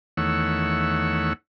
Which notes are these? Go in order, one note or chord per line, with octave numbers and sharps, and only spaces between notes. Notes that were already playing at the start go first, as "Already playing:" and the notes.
E2 D#3 A3 C#5 F#5 E6